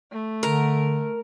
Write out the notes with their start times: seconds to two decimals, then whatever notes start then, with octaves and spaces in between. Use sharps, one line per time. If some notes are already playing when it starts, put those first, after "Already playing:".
0.12 A3
0.43 D3 A#4